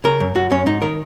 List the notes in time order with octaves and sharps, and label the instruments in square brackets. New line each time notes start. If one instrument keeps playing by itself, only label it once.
[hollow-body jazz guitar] C#3 A#4
F#2
F#2 F#4
F#2 C#4
G#2 D#4
D#3 A#4